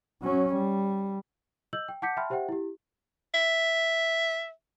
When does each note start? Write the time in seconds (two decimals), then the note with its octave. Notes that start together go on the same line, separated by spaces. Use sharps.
0.22 F#3 C#4
0.54 G3
1.73 D#5 E6 G6 F#7
1.88 G5
2.02 F#5 A5 D6 G6 B6 C#7
2.17 E5 G5 A5 B5 C6 F6
2.30 G4 C5 E5 F#5 G5
2.49 E4 G4
3.34 E5